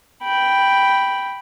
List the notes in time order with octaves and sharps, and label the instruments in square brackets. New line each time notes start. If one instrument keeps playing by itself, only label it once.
[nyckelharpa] G5 B5